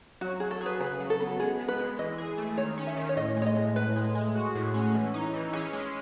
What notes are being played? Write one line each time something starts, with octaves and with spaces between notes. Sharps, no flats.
F#3 F#4
F#3 G#4
A4
G#4 B4
C#3 B4
F#3
A4
B3
G#3 G#4
B3
B4
G#3
E3 D#5
G#4
A3
D#3 C#5
C#4
E5
D#3
C#5
A2 D#5
G#3
C#5
D#5
A2
A2 B4
G#3
G#3
F#4
A2
C#4
E3
D#4
E3
C#4 G#4
G#3